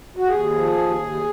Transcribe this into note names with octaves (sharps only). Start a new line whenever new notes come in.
F#4
D#2 G#4
F3
D#2
D#2